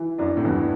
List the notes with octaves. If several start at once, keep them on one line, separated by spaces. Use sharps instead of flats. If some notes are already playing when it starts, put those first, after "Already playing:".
Already playing: E3
F#2 D4
A2
E2 G2 E3